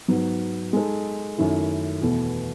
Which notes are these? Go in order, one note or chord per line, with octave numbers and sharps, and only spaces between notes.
G#2 F#3 B3
G#3 D#4 A4
F#2 D#3 A3 E4
E2 B2 A3